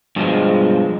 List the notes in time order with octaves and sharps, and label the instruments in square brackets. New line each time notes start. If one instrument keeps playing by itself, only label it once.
[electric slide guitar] G2 B2 F3 G#3